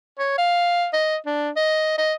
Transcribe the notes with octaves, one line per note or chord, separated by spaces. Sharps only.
C#5
F5
D#5
D4
D#5
D#5